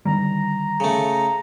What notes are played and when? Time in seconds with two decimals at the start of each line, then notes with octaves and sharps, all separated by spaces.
0.05 D3 D#3 G3 A#5
0.80 C#3 A3